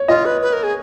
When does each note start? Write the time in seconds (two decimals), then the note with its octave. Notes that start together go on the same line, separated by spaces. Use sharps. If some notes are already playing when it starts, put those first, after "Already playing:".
Already playing: C#5
0.08 F4 D#5
0.25 B4
0.41 B4
0.53 A#4
0.63 G#4